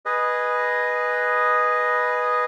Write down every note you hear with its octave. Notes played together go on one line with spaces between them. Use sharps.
G#4 B4 D#5